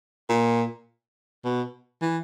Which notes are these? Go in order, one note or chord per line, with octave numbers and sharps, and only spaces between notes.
A#2
B2
E3